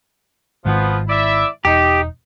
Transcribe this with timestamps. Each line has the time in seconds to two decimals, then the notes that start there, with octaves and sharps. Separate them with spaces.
0.65 G#1 G#2 D#3 F3 B3
1.08 E4 D5 E5
1.65 E1 D#4 G4